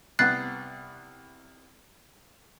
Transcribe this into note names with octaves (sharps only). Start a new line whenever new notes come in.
C2 B3 F#6 A6 C7